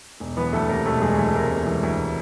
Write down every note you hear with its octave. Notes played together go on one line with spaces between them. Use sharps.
E1
E3 B3 B4
D2 A3 A4
C3 A#3 A#4
E1 A3 A4
E3 G#3 G#4
D2 A3 A4
C3 A#3 A#4
E1
E3
D2
C3